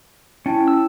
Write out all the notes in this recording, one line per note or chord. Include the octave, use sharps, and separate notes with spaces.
C#4 E4 G5 A5
E6